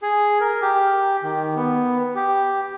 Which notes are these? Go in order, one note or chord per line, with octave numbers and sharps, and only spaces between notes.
G#4
A#4
G4
D#3
B3
G4